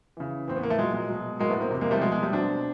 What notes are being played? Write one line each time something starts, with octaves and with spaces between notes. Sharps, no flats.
C#3 E3
A2 E3 C4
B3
A#3
A3
A#2 F#3 G#3
G#3
B2 F#3
A2 F#3 G#3 A#3
A3 B3
A#3 C4
C3 E3
G#3 A#3
G3 A3
B2 F#3 G#3
G#3
G3 A3
B2 F#3 C4 D4